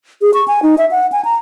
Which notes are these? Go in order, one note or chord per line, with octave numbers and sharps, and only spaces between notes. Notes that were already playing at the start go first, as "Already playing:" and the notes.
G#4
C#6
G#5
D#4
E5
F#5
G#5
A#5